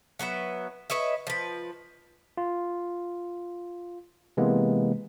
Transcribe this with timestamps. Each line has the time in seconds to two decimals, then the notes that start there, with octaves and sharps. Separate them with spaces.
0.19 F#3 B3 B4 E5
0.90 B4 C#5 D#5 E5
1.27 F3 B4
2.37 F4
4.37 C3 E3 G#3 A#3 B3